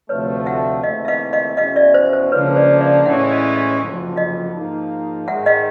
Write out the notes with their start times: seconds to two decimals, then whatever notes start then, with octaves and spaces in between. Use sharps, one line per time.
0.09 D2 C3 F3 A3 B4 C#5
0.46 E5 F#5
0.83 D#2 C#3 E3 A3 C4 D#5 F5
1.05 E5
1.08 D#5 F5
1.33 D#5 F5
1.57 E2 B2 G#3 C#4 E4 D#5 F5
1.76 D5 E5
1.94 C5
2.13 C5
2.32 C#2 C#3 F3 A#3 D4 B4 C#5
2.56 C5 D5
2.81 D5 E5
3.05 A2 E3 G#3 C#4 E5 F#5
3.31 D#5 F5
3.55 D#5 F5
3.80 F#1 F2 D3 F3
4.16 D#5 F5
4.54 G#2 F3 A#3 D#4
5.28 G#2 D#3 G#3 E5 F#5
5.46 D#5 F5